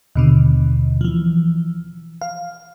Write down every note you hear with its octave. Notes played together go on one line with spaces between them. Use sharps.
D#2 B2 D3
E3 F3
F5